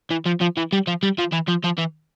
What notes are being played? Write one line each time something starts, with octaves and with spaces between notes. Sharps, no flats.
E3
F3
F3
E3
G3
F3
G3
F3
E3
F3
F3
E3